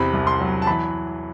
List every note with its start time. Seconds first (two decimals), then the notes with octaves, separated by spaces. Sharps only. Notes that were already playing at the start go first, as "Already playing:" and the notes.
Already playing: E2 C3 B5
0.13 C2
0.27 C6
0.40 F#3
0.62 A5
0.67 E3 B5